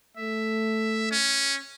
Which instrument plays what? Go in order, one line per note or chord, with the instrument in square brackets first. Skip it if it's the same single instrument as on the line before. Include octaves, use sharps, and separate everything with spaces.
[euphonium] A3 [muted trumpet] E5
[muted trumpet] C#4